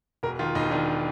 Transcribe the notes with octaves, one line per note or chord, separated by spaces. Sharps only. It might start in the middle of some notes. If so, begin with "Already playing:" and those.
E1 A#4
D#3 F4
E1 D#4
D#3 D4